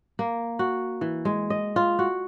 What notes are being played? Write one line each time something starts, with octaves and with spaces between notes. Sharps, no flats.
A#3
F#4
E3
G#3
D#5
F4
F#4